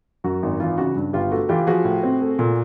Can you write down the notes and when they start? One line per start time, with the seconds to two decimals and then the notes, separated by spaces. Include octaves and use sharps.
0.24 F#2 F#4
0.43 G#1
0.60 E3 F4
0.78 C#3 F#4
0.96 G2
1.13 G1 F4 G4
1.31 A3 F#4
1.49 E3 F4 G4
1.67 F3 F#4 G#4
1.85 A2
2.03 C4
2.21 A3
2.39 A#2